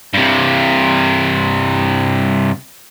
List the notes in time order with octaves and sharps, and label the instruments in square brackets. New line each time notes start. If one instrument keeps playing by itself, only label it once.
[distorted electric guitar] G2 C3